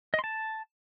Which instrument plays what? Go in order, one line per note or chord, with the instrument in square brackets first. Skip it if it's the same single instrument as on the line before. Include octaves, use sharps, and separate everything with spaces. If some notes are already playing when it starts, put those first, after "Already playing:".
[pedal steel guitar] D#5
C6
A5